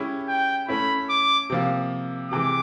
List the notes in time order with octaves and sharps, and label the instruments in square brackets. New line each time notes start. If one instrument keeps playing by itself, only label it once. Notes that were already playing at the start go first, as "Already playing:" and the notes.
Already playing: [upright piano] G#3 C#4 E4 G4
[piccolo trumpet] G5
[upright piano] A3 C#4 E4 [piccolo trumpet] B5
[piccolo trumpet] D6
[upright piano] C3 F3 A#3
[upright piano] C3 E3 G#3 [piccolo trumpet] D6